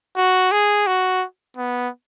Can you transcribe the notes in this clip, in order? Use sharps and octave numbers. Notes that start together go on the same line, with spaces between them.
F#4
G#4
F#4
B3